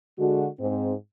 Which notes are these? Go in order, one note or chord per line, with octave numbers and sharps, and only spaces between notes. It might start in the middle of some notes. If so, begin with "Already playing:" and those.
D3 G#3 F#4
G#2 C4